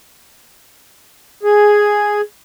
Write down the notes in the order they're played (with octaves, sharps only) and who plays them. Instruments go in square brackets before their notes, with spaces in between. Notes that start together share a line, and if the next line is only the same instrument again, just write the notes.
[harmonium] G#4